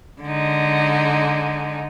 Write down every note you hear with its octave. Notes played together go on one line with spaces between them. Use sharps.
D3 G#3 D#4